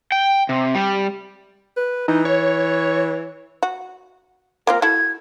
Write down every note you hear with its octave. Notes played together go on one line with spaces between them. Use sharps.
G5
C3
G3
B4
E3 D#4
C#5
F#4
A#3 C4 F4 A#4
E4 F#4 A4 G#6